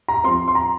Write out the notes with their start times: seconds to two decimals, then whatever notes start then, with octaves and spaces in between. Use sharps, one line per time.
0.08 A#5
0.24 F3 C4 C6
0.48 C6
0.55 A#5